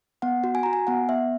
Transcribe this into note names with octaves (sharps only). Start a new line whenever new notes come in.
B3 F#5
F#4
G#5
F#4 A#5
G#5
B3 F#5
B3 E5